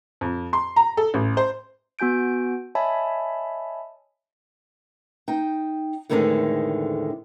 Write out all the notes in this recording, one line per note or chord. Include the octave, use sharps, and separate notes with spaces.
F2
C6
A#5
A4
A1
C5
B3 F#4 G#5 G6 D7
C#5 D#5 E5 G#5 A5 B5
D#4 G5
E2 A2 D3 D#3 G#3 C4